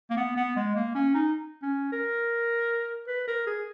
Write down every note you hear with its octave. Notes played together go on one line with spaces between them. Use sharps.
A#3
B3
B3
G#3
A#3
C#4
D#4
C#4
A#4
B4
A#4
G#4